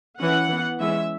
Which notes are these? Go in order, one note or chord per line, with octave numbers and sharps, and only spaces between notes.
E3 C#4 F#5
E3 B3
E3 G#3 C#4 E5